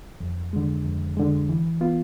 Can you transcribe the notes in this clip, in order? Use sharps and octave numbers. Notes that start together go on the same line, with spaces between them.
F2
D3 G#3
F2
D3 G#3
E3
B3 F4